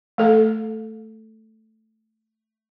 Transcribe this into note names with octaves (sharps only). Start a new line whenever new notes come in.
A3 A4 F5